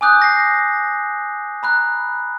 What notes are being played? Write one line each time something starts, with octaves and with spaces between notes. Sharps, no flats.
G#5 D6 D#6 F#6 G6
A#6 C7
A#5 B5 F#6